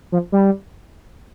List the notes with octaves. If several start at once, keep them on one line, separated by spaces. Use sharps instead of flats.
F3
G3